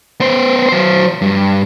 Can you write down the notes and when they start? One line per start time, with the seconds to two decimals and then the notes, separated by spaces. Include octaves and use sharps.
0.20 B3 C5
0.69 F#3 C5
1.22 G2